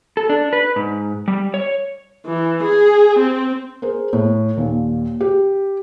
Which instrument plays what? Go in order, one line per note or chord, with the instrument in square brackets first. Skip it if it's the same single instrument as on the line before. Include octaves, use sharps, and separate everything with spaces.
[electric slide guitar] A4
D4
B4
G#2
G3
C#5
[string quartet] E3
G#4
C4
[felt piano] G#4 A#4 C5
A2
D#2 A#2
G4